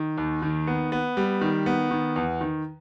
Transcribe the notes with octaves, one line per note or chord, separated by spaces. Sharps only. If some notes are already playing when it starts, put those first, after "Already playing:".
Already playing: D#3
D#2
D#3
B3
B3
G3
D#3
B3
D#3
E2
D#3